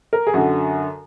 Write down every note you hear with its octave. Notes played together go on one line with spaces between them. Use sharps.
A#4
G#4
F#2 D3 F#4